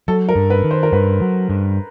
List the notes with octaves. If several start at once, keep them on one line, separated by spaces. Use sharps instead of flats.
F#3 A4
A#4
G2
B4
D#3
C5
A#4
G2 B4
F#3
G2